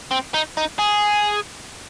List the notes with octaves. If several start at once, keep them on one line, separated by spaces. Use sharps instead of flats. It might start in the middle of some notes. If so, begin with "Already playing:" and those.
C4
D#4
D#4
G#4